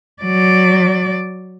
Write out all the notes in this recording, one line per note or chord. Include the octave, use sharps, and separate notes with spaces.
F#3 D5